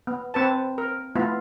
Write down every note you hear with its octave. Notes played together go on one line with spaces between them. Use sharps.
B3
C4 B4 A5
A#4
A3 B3 E4 F4